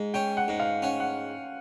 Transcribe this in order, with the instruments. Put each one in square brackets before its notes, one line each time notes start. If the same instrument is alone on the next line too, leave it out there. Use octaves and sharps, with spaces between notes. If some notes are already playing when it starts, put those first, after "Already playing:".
Already playing: [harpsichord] G#2
[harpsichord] C#4 [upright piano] G5
[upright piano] F#5
[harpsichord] G#2
[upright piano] F5
[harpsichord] C#4 [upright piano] F#5
[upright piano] F#5